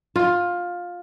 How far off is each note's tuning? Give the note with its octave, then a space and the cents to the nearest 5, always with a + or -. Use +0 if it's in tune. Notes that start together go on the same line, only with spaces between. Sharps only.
F4 +15